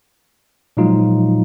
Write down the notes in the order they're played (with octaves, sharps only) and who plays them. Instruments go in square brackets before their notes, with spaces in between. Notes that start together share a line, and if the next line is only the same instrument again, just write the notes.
[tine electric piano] A#2 F3 F#3 G#3 D#4 F4